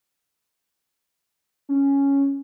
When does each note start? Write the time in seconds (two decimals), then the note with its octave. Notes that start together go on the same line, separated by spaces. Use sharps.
1.69 C#4